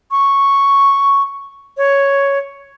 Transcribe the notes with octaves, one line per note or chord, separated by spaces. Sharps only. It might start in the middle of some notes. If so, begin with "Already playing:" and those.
C#6
C#5